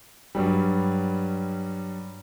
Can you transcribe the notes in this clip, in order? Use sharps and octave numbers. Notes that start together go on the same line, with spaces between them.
G2 F#3 G3